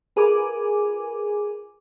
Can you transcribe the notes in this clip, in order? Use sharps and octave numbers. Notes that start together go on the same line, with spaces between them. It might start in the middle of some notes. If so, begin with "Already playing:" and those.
F4 G#4 A#4 B4 G#5 D6